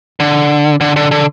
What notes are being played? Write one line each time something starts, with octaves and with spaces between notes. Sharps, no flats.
D3
D3
D3
D3